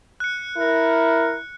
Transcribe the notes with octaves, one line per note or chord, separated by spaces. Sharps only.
F#6 C#7
E4 A#4